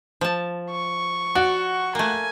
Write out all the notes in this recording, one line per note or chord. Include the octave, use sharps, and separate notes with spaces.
F3 A5
C#6
F#4 D5
A3 A#3 G#5